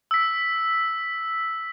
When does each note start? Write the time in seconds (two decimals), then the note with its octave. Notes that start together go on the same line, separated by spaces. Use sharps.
0.11 E6 B6